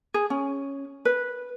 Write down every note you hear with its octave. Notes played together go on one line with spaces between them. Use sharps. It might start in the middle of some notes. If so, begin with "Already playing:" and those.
G#4
C#4
B4